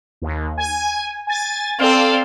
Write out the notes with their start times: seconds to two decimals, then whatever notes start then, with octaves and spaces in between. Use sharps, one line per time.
0.22 D#2
0.58 G#5
1.27 G#5 A6
1.79 C4 A4 D5 F5